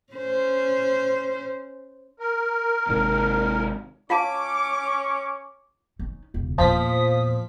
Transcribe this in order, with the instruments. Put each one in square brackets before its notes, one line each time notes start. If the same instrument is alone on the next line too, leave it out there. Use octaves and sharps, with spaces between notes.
[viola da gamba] C#4 C5
[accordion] A#4
[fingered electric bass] G#1 C3 D#3
[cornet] C#4 [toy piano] F4 F5 A5 [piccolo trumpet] C#6 [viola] D6
[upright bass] C#4 D#4
E1 C#2
[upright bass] E2 A#2 [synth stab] F3 B6 [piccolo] D#6